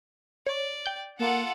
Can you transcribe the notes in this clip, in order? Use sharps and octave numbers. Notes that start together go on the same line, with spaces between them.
C#5 D5
G5 G6
A#3 F4 A4 F#5